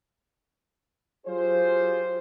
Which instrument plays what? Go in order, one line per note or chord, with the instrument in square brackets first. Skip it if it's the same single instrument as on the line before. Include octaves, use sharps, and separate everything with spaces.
[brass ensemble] F#3 F4 G4 G#4 C5